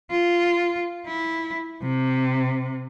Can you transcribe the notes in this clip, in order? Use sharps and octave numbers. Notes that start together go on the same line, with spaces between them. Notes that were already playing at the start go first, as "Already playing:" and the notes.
F4
E4
C3